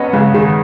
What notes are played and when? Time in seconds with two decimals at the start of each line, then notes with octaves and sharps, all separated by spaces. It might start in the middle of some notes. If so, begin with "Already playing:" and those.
Already playing: F#3 B3 C#4 D#5
0.13 C#3 G#3
0.34 D#3 G#4